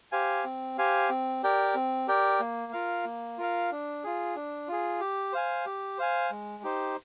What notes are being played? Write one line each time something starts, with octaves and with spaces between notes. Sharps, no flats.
G4 C5 F5 G#5
C4
G4 C5 F5 G#5
C4
G4 A#4 D5 G5
C4
G4 A#4 D5 G5
A#3
F4 A#4 F5
A#3
F4 A#4 F5
D4
F4 G#4
D4
F4 G#4
G4
C5 F5 G#5
G4
C5 F5 G#5
G#3
D#4 G4 C5